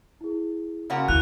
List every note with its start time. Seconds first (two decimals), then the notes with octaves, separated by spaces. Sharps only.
0.21 E4 G#4
0.90 C#3 A#3 F#4 C#5 B5 C6
1.08 D#2 E4 F#5 F#6 F7